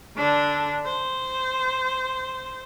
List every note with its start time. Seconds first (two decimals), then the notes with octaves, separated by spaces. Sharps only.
0.17 D3 D4
0.86 C5